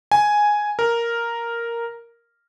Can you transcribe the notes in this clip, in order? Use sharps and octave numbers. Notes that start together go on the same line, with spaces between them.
G#5
A#4